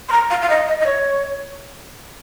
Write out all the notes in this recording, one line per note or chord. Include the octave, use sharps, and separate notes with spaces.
C6
A#5
F5
F5
D#5
D#5
D#5
C#5